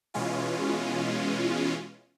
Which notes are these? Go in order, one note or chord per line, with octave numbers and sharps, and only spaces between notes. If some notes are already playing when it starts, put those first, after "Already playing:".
B2 E3 G#3 C#4 F4